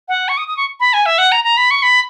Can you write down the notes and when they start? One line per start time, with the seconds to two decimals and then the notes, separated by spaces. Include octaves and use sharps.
0.08 F#5
0.29 C#6
0.37 D#6
0.48 D#6
0.57 C#6
0.80 B5
0.93 G#5
1.06 E5
1.18 F#5
1.32 A#5
1.44 A#5
1.57 B5
1.71 C#6
1.83 B5